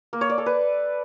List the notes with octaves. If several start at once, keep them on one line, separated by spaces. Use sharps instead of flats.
A#3
C#5
D5
A4
B4